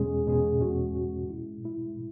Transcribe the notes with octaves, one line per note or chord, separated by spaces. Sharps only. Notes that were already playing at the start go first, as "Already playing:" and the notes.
Already playing: E2 B2 G#3 C#4 G#4
E2 B2 G#3 C#4 G#4
E2 B2 G#3 C#4 F#4
E2 B2 G#3 C#4 F#4
B2 G#3 E4
B2 G#3 E4